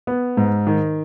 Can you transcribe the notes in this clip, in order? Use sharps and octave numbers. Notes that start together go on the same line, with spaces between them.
B3
G#2
D#3